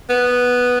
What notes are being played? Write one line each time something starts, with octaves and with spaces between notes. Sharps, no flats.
B3